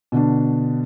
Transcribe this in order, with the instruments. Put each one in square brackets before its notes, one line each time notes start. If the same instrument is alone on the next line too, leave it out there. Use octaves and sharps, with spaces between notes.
[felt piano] B2 D3 D4